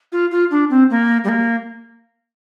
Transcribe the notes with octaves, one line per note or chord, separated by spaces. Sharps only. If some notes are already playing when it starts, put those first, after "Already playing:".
F4
F4
D4
C4
A#3
G3
A#3